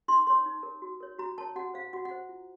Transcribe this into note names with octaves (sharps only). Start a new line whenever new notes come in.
D#4 C6
A#4 C#5 C6
D#4
A#4 C#5
F#4
A#4 C#5
F#4 A#5
A#4 C#5 A5
F#4 F#5
C5 F5
F#4 F#5
F#5
C5
F4